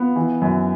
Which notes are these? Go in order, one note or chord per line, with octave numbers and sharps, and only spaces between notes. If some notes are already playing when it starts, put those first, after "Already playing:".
Already playing: B3 F4
E3
F#2